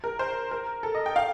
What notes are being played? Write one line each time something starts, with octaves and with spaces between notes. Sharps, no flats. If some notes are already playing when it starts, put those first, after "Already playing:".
A#4
C5
A#4
A4
D#5
G5
F5